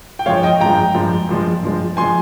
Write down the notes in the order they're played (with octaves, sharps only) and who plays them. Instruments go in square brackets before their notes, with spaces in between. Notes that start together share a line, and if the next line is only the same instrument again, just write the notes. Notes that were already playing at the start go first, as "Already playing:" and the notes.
[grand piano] G5
G2 F3 G#3 C#5 F5
D#5 G5
G2 F3 G#3 G5 A#5
G2 F3 G#3
G2 F3 G#3
G2 F3 G#3
F3 G#3 G#5 C6